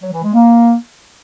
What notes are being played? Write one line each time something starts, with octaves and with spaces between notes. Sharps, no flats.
F#3
E3
G#3
A#3